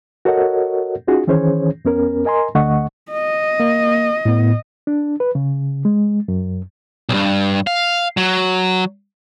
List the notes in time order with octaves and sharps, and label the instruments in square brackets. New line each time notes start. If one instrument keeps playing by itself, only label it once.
[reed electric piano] F#4 A4 A#4 C#5 D#5 F#5
C#4 D#4 F4 F#4 G#4
D#3 E3 C#4 G#4 C5 C#5
F2 B3 C#4 A#4
A#4 D#5 G#5 A#5 C6
D2 D3 A3 D#5 F#5 C#6
[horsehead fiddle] D#5
[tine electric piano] A#3
A2 B3
[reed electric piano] D4
B4
C#3
G#3
F#2
[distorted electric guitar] B1 G2
F5
F#3